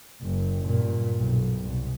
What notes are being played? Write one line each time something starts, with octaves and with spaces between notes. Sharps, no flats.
F#1
G2 A#2
B1
C2